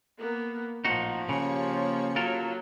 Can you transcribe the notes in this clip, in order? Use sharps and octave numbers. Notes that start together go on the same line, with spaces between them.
A#3 B3
A1 A#2 F3 D#4 F#4
C#3 A#3 G4 C#5
F#3 F4 A4 A#4